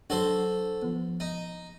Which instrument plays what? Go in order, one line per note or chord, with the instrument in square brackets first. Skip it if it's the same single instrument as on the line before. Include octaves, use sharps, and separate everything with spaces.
[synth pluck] F#3 D4 [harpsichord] F#4 A4 C5
[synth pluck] F3 B3
[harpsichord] D#4